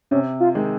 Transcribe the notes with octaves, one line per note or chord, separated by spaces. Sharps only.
C3 C#4
F4
D#3 G#3